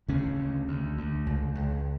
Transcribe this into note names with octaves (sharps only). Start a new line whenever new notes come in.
D2 C#3 C#4
D2
D2
D2
C#2
C#2